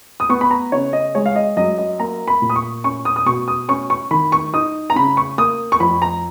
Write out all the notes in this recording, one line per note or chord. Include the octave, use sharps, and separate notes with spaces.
D#6
B3 C#6
B5
A#5
C#3 C#5
D#5
G#3 C#5
F5
D#5
F#2 D#5
D#5
A#3 A#5
B5
A#2
D#6
C#6
C#4 C#6
D#6
D#6
B2 C#6
D#6
C#4 C#6
C#6
D#3 B5
C#6
D#4 D#6
A#5
C#3 B5
C#6
A#3 D#6
C#6
F2 B5
A#5